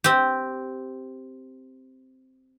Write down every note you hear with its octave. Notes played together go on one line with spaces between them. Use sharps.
C4 G4